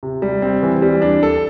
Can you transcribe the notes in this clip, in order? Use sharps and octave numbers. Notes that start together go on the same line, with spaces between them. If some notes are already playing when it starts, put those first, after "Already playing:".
C3
G3
C4
E3
G3
D4
A4